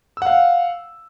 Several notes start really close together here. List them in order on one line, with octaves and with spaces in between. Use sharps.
E6 F#5 F5